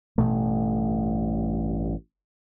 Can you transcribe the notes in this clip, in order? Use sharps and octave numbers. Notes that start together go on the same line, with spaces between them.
A1 G2 B2 A3